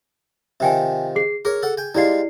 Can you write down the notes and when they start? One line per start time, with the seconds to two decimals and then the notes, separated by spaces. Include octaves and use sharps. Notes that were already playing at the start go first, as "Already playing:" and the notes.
0.60 C3 D#3 F3 E5 G5 G#5
1.16 G#4 C7
1.45 G#4 A#4 C#5
1.63 A4 F#5
1.78 G5 G#5
1.95 G3 G#3 E4 F4 D5 C7